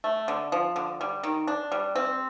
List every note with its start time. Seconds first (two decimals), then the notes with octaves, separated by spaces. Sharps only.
0.04 A3
0.28 D3
0.52 F3
0.76 D3
1.01 G3
1.23 D#3
1.47 D4
1.72 G3
1.96 C4